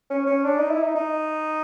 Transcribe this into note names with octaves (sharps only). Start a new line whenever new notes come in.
C#4
C#4
D4
D#4
E4
D#4
D#4